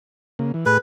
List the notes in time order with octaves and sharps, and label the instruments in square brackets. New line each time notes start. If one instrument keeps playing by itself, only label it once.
[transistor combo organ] C#3 A#3
E3
[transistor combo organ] A2 G#4 [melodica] B4